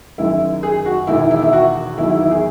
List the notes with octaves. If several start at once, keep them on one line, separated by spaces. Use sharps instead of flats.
F#1 F#2 D#3 E4
G#4
F#4
E1 E2 D#3 E4
E4
E4
E4
F#4
E2 D#3 F#3 E4
E4
E4
G#4